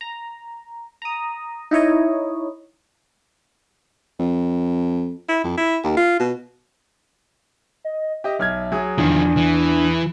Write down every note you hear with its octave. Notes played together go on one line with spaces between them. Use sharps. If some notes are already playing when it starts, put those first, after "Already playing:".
A#5
A#5 D#6
D#4 E4 C#5 D#5
F2
E4
F2
E4
D#2
F4
B2
D#5
G4 D#5 E5
B1 F6 G#6
F#3 G#4
E2 D#3 F3 D4
E3